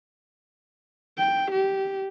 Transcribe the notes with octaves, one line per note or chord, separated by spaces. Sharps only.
G5
G4